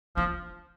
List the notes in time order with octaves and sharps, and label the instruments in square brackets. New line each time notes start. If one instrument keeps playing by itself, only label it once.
[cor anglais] F3 [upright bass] D4